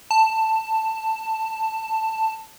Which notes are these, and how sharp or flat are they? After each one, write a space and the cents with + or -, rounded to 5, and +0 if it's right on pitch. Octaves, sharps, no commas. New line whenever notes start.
A5 +10